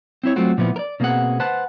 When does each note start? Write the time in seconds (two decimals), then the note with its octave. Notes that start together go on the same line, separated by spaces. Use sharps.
0.23 C4 E4 C#5
0.36 F#3 A3 C4 F4 F#4
0.58 A#2 F3 B3 E4
0.76 A#4 D5
1.00 B2 A#3 C4 G#4 F#5
1.40 B4 C5 F#5 A5